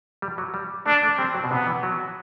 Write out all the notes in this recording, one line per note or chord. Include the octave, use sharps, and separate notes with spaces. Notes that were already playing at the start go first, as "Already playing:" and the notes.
G3
F#3
G3
A3 D4
A3
G3 C4
F#3
B2
C3 B3
E3
F#3